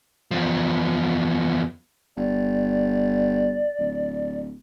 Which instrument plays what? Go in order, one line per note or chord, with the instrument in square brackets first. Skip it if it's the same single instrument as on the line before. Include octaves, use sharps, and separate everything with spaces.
[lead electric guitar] E2 F3
[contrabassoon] G1 [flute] D5
[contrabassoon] D1